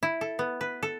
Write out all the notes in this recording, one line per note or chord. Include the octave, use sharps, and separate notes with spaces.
E4
A4
B3
B4
A4